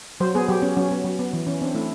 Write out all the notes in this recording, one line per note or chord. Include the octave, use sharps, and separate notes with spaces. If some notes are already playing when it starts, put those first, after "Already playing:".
F#3 C5
B3 G#4
F#3 G4
B3 C#4
F#3 C#4
B3
F#3
B3
E3
E3 C#4
C4 D4
A3 E4